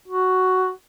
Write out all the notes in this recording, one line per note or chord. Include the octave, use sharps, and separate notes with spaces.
F#4